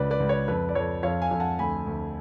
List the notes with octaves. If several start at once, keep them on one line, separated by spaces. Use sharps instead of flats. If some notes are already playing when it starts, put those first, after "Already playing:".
Already playing: C#2 C#3 B4 D5
B4 D5
C#2
C#5
F2 B4
D5
F2 C#5
F2 C#5 F5
F5 G#5
F2
F#5 A5
D2 G#5 B5
D2